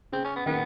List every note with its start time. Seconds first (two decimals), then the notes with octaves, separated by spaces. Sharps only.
0.12 C#3 C4
0.24 C#4
0.36 B3
0.46 D#3 B3